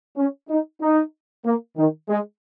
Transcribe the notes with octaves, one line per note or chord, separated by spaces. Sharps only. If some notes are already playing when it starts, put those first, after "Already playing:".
C#4
D#4
D#4
A#3
D#3
G#3